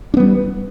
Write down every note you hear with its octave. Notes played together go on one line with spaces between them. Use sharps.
G3 B3 D4